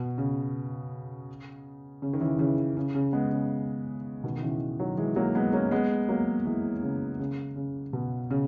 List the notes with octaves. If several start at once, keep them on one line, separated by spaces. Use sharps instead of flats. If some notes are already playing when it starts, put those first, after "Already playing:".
Already playing: B2
C#3
C#3
D#3
C#3 E3
C#3 E3
C#3
C#3
G#3 B3
C#3
B2 D#3
D#3
C#3 E3
D#3 F#3
E3 G#3
F#3 A#3
G#3 B3
A#3 C#4
G#3 B3
F#3 A#3
E3 G#3
C#3
C#3
C#3
B2
C#3